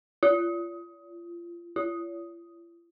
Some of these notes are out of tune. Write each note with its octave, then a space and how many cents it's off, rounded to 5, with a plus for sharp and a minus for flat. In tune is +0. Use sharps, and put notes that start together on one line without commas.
F4 -30
F4 -45